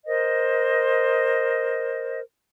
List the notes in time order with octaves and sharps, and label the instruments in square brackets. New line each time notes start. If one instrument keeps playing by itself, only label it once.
[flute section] A#4 C5 D#5